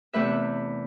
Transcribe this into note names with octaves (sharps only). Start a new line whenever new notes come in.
E2 C3 A3 B4 E5